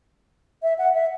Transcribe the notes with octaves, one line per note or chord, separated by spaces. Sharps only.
E5
F#5
E5